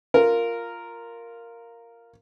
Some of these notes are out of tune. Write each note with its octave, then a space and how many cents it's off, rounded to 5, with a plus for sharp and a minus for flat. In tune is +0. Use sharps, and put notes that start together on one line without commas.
F4 +0 A#4 -5